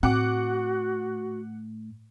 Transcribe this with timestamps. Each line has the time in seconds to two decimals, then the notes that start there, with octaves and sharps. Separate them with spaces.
0.03 A2 C4 F#4 F#5 D6